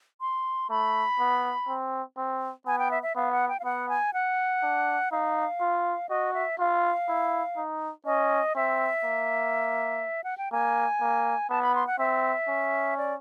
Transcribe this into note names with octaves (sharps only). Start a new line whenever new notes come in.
C6
A3 B5
B3
C4
C4
B3 G#5
G5
E5
E5
B3 F5
F#5
G5
F5
B3 F#5
G#5
F#5
D4
D#4 F5
F4
F#4 D#5
E5
F4 F5
E4
D#4
C#4 D#5
C4 E5
A#3
F#5
G5
A#3 G#5
A#3
B3 A5
B5
C6
F#5
C4 E5
C#4
D5